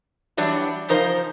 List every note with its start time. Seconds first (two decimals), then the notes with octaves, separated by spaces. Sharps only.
0.37 E3 F#3 G3 D4
0.88 C#3 F3 D#4 A#4 C5